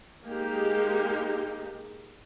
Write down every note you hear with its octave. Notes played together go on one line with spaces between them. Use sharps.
G#3 A#3 D#4 G4